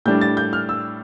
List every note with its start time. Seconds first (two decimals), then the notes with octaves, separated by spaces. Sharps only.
0.05 A2 G3 D4 G6
0.21 A6
0.37 G6
0.53 F6
0.69 E6